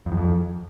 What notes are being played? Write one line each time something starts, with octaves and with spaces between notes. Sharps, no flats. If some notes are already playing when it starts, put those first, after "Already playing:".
F2
E2
F2